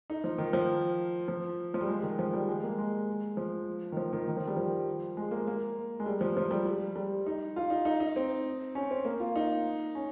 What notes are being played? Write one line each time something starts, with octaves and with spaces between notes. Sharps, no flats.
D#4
F3
D#3
F3
F3
F3
G3
G#3
D#3
F3
G3
G#3
A#3
G#3
F3
D#3
F3
D#3
D#3
F3
G3
F3
G#3
A#3
A#3
G#3
G3
F3
F3
G3
G3
G3
D#4
F4
D#4
D#4
D#4
C4
C#4
C4
A#3
F4
D#4
C#4